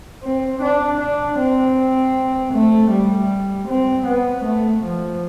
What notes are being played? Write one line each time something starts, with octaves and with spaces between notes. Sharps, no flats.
C4
D4
D4
C4
A3
G3
C4
B3
A3
F3